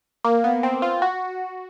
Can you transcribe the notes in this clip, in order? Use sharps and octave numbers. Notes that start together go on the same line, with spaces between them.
A#3
B3
C4
F4
F#4